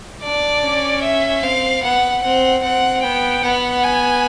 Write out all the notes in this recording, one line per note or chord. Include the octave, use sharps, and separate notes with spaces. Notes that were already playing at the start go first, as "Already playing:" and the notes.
D4 D5
C#4
E5
C4 F5
B3 F#5
C4 F#5
C4 F#5
B3 G5
B3 F#5
G#5